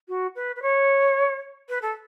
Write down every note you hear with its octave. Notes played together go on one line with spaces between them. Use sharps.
F#4
B4
B4
C#5
B4
A4